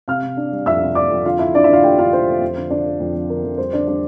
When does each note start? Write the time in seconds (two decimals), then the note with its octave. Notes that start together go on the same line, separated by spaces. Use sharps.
0.08 C3 F5 F6
0.23 C3
0.37 D4
0.52 G3
0.66 F2 E5 E6
0.81 C3
0.95 D4 D5 D6
1.10 F2
1.25 D3 F4 F5
1.39 D4 E4 E5
1.54 D3 D4 D5
1.64 E4 E5
1.69 D3 F4 F5
1.83 A3 G4 G5
1.98 D4 F4 F5
2.13 D4 C5
2.28 A3
2.41 F2
2.57 D3
2.70 D3 D4 D5
2.86 D3
3.00 F2
3.15 F2
3.29 D3 A#4
3.44 F2
3.58 G3 C5
3.73 D3 D4 D5
3.87 G3 D4 D5